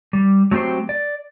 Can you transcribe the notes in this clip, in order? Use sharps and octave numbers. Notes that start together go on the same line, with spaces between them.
G3
F#3 A3 C4 G4 C5
D5